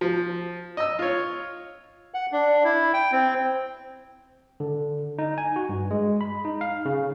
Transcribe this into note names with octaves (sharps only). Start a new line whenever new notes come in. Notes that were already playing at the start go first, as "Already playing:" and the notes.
F3
D#5 E6
F4 C#5
F#5
D4
E4
G5
C4
D3
D#4
G#5
F#4
G2
G#3
B5
D#4
F5
C#3